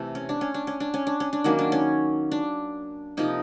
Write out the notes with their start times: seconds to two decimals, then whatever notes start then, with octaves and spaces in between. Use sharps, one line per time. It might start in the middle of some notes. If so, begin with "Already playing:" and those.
Already playing: C3 E3 A3
0.15 C#4
0.29 D4
0.41 C#4
0.54 D4
0.67 C#4
0.80 D4
0.94 C#4
1.07 D4
1.20 C#4
1.33 D4
1.44 D#3 F#3 A#3 C#4
1.59 D4
1.72 C#4
2.31 D4
3.17 C3 F3 A#3 D#4